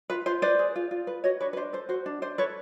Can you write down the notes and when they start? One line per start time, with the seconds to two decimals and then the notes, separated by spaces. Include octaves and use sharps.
0.10 F4 B4
0.26 F4 C5
0.42 B4 C5 D5
0.59 G#4
0.76 F4
0.91 F4
1.07 B4
1.24 F#4 C#5 D#5
1.40 D4 B4 C#5
1.53 B4
1.56 D4 C5
1.73 A4 C5
1.89 F#4 C5
2.06 D4
2.22 D4 C5
2.38 A4 B4 C#5